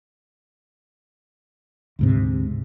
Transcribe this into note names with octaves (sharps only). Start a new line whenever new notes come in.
D2 G#2 C3